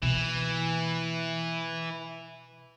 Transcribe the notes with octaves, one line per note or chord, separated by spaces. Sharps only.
B2 E3 A#3